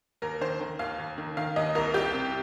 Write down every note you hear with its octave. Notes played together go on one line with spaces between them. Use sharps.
D#2 A#4
D#3 C5
D#3
D#2 F5
D#2
D#3
D#3 F5
D#2 D#5
C2 A#4
C2 G4
C3